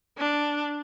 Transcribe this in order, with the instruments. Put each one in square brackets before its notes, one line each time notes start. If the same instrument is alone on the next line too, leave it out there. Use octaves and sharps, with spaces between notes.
[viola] D4